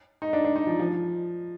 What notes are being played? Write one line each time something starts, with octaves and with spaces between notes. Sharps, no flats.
D#4
D4
D4
D#4
F3
F3